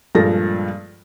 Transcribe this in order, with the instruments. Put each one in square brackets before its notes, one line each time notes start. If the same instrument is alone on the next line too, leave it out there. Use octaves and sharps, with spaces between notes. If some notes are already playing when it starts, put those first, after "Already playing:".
[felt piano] G2 A#2 F3 G#3 A4 A#6